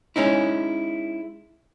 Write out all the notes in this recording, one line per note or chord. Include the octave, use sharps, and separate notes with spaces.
G#3 C#4 D#4 E4